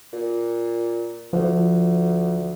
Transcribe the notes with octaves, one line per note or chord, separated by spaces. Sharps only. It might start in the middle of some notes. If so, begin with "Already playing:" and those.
A#2
D2 F3